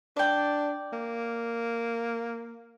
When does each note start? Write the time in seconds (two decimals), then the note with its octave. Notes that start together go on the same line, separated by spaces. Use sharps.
0.16 D4 D5 G5
0.93 A#3